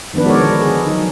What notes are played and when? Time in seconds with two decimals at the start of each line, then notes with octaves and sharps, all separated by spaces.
0.14 D#3 F3 B3 D4 B4
0.25 G#3 F#4 A4 A#4 C#5 D5
0.41 D3
0.60 G#4
0.86 F#3 D#4